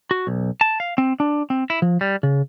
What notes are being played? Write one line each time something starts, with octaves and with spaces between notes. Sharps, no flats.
F#4
B1
A5
F5
C4
D4
C4
E4
F3
G3
C#3